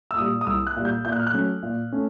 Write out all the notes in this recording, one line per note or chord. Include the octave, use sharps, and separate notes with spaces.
E6
A#2 G3 D#6
D#6
C2 E6
F#6
A#2 G3
G6
A#2 G6
F#6
F6
F#6
F#3 A3 C#4
A#2
A3 C#4